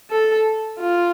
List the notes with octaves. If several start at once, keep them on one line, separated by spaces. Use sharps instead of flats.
A4
F4